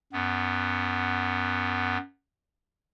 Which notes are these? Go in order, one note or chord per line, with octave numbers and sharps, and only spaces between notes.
F#2 B3